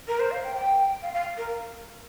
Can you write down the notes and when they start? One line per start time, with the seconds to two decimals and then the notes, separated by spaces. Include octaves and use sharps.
0.08 A#4
0.19 C5
0.31 F5
0.44 G5
0.55 G5
1.02 F5
1.14 F5
1.37 A#4